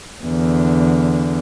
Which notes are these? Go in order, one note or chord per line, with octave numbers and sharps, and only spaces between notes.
E2 D3